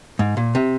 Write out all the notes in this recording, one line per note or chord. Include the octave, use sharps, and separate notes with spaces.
G#2
A#2
C3